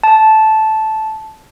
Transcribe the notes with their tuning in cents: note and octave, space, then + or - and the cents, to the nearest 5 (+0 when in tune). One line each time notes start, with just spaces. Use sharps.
A5 -10